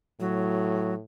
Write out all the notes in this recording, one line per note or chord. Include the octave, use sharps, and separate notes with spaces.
A2 F#3